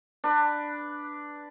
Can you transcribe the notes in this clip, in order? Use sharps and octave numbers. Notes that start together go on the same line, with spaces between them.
D4 B4